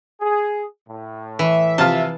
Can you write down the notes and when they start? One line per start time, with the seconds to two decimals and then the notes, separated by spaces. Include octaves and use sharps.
0.21 G#4
0.89 A2
1.39 E3 E5
1.78 C3 F3 F4 A5